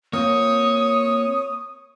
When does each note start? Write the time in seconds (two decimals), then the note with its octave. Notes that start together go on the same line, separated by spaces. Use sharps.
0.13 A#3 C4 F4 C#5 D#6